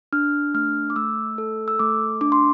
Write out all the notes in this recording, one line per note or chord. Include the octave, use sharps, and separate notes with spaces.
D4 F6
A3 F6
D6
A3 E6
A4
E6
A3 D6
D4 D6
C6